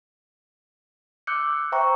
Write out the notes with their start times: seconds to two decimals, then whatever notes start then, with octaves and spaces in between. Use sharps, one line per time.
1.27 D6 E6 F#6 G6 C#7
1.72 C5 E5 G5 A#5 C#6